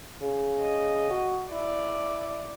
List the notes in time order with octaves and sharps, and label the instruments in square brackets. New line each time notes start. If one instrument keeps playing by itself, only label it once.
[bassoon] C#3
[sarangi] D#5
[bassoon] F#4
[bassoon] E4 [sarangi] D5